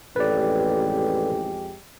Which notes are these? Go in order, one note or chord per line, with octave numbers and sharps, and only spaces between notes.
A1 F2 G#3 G4 A4 B4 D5